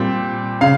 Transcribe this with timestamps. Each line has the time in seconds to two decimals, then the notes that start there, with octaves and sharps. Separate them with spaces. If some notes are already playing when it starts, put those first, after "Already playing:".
Already playing: A#2 G3 C4
0.61 C#3 F5